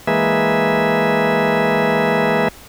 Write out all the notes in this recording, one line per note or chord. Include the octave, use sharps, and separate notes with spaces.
E3 G#3 A#3 G#4 B4 E5